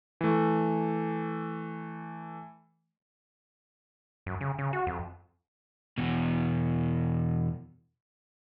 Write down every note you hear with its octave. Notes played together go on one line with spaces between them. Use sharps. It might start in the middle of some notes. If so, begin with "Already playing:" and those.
E3 A3
F#2
C#3
C#3
F#4
F2
E2 B2